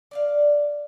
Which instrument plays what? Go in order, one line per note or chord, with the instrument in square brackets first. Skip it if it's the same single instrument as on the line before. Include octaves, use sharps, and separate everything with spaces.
[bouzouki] D5 E5 F5